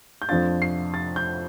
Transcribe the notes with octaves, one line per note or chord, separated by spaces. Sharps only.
G6
F2 F3 D4 F4 A6
C7
A6
G6